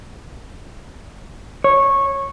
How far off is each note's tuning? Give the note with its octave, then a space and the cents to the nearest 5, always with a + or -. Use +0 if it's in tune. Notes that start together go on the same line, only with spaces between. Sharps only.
C#5 -15